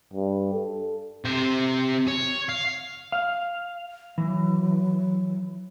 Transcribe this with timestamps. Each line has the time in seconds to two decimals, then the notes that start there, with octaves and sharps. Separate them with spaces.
0.14 G2
0.53 A4
1.25 C3 C5
2.08 C#5
2.49 F5
3.12 F5
4.18 E3 F#3